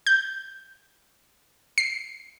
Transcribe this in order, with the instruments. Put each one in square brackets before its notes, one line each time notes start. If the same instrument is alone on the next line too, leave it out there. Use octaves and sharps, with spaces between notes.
[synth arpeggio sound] G6
C7